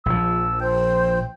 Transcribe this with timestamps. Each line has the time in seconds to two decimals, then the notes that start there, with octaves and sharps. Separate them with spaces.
0.06 A#1 F3 E6
0.61 C5 G5